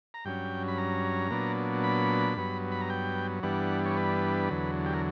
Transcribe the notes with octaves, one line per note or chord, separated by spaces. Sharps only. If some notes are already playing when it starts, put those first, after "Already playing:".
A#5
G2 F#3 C#4 G5
B5
A#5
A#2 F#3 B3 D4
B5
G2 F#3 B3
B5
A#5
G5
G2 E3 G3 B3 D4 F#5
C#5
B4
E2 D3 F#3
G4
A#4